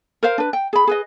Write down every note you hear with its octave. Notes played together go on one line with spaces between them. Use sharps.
A#4 C5 F5
D4 B4
G5
G#4 B5
G#4 B4 D#5